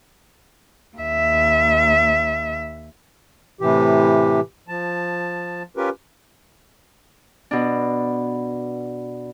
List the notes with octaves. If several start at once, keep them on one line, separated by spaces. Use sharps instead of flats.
D#2 E5
A2 C3 E3 G4
F3 A5
C#4 F4 G4 A#4 B4
B2 D4